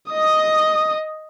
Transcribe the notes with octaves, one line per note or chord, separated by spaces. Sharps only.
D#5 D#6